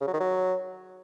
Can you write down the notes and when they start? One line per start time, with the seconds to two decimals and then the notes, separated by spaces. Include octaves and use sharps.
0.01 C#3
0.07 F#3
0.14 D#3
0.20 F#3